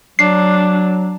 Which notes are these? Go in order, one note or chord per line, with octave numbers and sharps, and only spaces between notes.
F#3 D4 C7